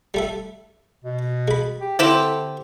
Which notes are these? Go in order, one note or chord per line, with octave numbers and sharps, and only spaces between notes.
G3 A3 E5
B2
G#3 B5
G4
D3 C4 E4 G4